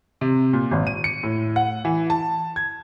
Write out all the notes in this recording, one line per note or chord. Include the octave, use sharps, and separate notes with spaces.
C3
A#2
G#1
D#7
C#7
A2
F#5
E3
A5
G#6